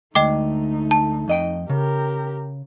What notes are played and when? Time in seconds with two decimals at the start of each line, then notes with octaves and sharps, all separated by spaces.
0.15 D2 G#3 A3 D#4 D#5 G5 D6
0.91 A5
1.28 F2 D#5 G5
1.70 C#3 G4 A#4